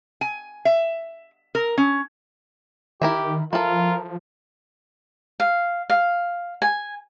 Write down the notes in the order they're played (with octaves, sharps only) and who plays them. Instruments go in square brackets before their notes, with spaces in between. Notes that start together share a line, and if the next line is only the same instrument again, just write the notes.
[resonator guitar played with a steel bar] G#5
E5
A#4
C#4
[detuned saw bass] D#3 [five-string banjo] E4 A#4 E5 [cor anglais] G4
[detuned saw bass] F3 [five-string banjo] E4 A4 [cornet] F4 [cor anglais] A#4
[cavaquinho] F5
F5
G#5